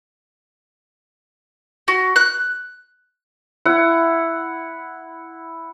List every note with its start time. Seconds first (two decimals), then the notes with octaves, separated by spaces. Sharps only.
1.88 F#4
2.16 F#6
3.66 E4 F#5